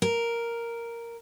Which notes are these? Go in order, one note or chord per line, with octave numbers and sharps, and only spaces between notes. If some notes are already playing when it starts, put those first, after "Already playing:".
A#4